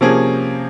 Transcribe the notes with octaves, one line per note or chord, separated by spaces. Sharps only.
C3 F3 A#3 C#4 G#4